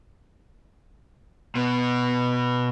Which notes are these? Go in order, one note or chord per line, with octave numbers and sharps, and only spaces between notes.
B2 B3